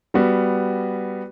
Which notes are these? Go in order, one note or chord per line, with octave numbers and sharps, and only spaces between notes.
G3 B3 F#4